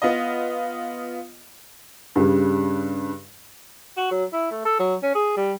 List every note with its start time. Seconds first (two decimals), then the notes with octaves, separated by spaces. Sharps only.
0.02 B3 F4 D#5
2.16 G2 C#3 G3
3.97 F#4
4.11 F#3
4.33 E4
4.51 A3
4.65 A4
4.79 F#3
5.03 C#4
5.15 G#4
5.37 G3